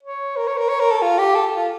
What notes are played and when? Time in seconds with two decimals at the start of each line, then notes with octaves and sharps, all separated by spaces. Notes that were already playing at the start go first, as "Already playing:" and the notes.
0.03 C#5
0.37 A#4
0.48 C#5
0.58 A#4
0.69 C#5
0.80 A#4
0.91 A4
1.02 F4
1.19 G4
1.35 A4
1.56 F4